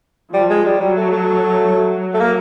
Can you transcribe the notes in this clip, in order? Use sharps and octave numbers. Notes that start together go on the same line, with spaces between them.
F3 G3
G#3
G3
F#3 G3
A3
A3
F#3
A3
A#3